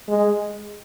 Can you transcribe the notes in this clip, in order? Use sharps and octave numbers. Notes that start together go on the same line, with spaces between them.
G#3